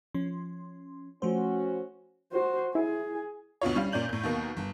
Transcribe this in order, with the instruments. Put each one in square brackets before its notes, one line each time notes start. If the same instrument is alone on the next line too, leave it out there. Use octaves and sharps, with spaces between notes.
[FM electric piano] F3 C#4 C6
[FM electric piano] F3 A3 C5 [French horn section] C#4 F#4
[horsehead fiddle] F#4 C5
[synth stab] E4 [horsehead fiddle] G#4
[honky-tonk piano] D2 B2 F4 C#5
G3 C#4 F5
A#2 C#4 D5 G6 F#7
A2 G6
D#2 B2 A#3
G1